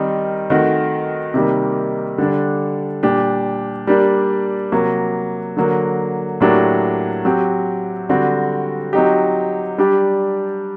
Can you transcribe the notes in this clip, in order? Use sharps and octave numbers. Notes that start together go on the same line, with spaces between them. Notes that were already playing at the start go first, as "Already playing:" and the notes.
Already playing: D#3 G3 C4 D#4
D#3 A3 C4 F#4
C3 D#3 G3 A#3
D3 G3 D4
A#2 G3 D4 G4
G3 A#3 D4 G4
C3 F#3 A#3 F#4
D3 F#3 A#3
A2 F#3 A#3 D4 G4
F#3 C4 G4
D3 G3 C4 F#4
F#3 C4 D#4 G4
G3 D4 G4